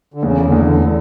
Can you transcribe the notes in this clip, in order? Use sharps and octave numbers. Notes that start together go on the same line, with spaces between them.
D3
E2 C#3
D3
E2
D3